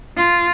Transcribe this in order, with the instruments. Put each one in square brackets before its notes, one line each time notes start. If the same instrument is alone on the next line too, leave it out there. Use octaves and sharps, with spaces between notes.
[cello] F4